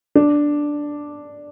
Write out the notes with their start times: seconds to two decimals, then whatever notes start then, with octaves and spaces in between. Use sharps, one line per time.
0.15 D4